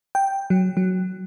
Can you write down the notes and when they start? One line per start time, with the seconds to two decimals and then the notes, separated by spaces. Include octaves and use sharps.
0.15 G5
0.50 F#3
0.77 F#3